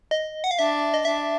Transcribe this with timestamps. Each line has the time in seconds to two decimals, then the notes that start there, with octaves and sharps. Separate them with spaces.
0.11 D#5
0.44 F#5
0.51 F5
0.59 D4 E5
0.94 D#5
1.05 D4 E5